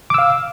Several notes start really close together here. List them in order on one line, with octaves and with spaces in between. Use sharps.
D6 E6 F5